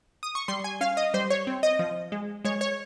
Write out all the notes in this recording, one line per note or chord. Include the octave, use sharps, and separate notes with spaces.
D#6
C#6
G3 C6
G#5
C#4 F5
D#5
G3 C5
C#5
C4
D#5
F3
G#3
G#3 C#5
C#5